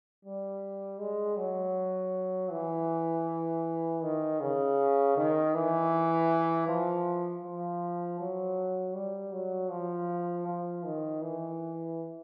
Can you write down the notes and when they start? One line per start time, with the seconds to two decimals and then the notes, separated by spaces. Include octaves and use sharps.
0.25 G3
1.00 G#3
1.37 F#3
2.51 E3
4.03 D#3
4.40 C#3
5.17 D#3
5.55 E3
6.68 F3
7.44 F3
8.20 F#3
8.95 G3
9.33 F#3
9.70 F3
10.47 F3
10.85 D#3
11.23 E3